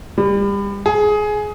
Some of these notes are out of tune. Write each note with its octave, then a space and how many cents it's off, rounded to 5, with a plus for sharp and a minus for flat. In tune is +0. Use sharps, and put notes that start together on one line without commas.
G3 +35
G#4 +15